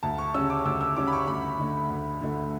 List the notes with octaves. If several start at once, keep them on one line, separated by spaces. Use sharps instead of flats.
D2 A5
C#6
C#3 G3 C#4 E6
D6
D2 E6
E6
C#3 G3 C#4 D6
B5
C#6
D2 B5
D3 A3
D2
D3 A3